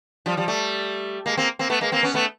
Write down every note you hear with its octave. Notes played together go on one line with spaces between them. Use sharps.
F3 G3
F3 G3
G3 A3
G#3 A#3
A#3 C4
A#3 C4
A3 B3
G#3 A#3
A#3 C4
B3 C#4
A3 B3